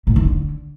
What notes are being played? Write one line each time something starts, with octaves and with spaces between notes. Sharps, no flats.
A2
D#3
D3